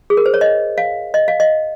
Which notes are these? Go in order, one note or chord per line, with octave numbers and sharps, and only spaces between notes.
G#4
A#4
C5
C#5
D#5
F5
D#5
F5
D#5